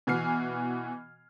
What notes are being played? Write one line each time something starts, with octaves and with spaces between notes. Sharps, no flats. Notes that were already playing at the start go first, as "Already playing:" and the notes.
B2 E3 F#4 G#5 F6 C7